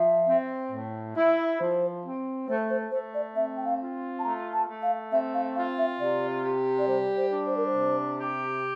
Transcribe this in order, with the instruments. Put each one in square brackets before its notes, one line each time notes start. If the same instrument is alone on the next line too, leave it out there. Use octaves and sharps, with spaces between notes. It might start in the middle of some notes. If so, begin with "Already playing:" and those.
Already playing: [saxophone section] F3 [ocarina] E5
[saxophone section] C4
A2
E4
[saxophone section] F3 [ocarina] C5
[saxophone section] C4
[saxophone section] A3 [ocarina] C5
[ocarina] C5
[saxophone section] A3 [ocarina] C5
[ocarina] D5
[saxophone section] C4 [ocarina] E5
[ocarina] G5
F5
[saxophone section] F4
[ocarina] A5
[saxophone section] A3 [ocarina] A#5
[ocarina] A5
[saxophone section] A3
[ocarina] F5
[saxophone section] C4 [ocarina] E5
[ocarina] F5
[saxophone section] F4 [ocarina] F5
[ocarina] E5
[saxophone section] C3 [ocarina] D5
[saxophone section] G4
[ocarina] D5
[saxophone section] G3 [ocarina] C5
[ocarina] C5
[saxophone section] D4
[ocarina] C5
A#4
C5
[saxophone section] C3
G4